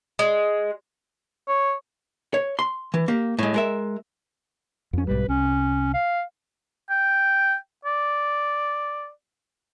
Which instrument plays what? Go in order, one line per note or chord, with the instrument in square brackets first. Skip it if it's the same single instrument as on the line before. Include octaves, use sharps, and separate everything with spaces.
[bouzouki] G#3
[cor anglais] C#5
[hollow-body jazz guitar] C#5
C6
E3
A#3 G4
A2 G#3
G#3 A#4 E5
[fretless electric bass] F2 C#4
[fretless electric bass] B1 G#2 G3 [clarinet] B4
[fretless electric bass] C2 [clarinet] C#4
[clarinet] F5
[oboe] G5
D5